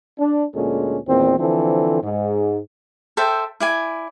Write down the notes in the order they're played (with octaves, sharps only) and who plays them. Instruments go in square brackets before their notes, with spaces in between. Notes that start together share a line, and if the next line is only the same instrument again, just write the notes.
[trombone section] D4
D2 A#2 G#3 C#4 A4
E2 A#2 D#3 C4
D3 E3 F3 C4 A4
G#2
[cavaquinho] A4 C5 E5 G5
E4 D5 G#5